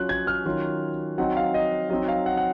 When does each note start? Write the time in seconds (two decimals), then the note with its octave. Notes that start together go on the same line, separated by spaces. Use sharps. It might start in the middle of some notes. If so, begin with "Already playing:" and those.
Already playing: F#3 C#4 F4 F#6
0.09 G#6
0.27 F6
0.45 D#3 F#3 C#4 F4
1.18 F#3 C4 D#4 F#5
1.37 F5
1.54 D#5
1.90 F#3 C4 D#4 D#5
2.08 F5
2.26 F#5
2.37 F#5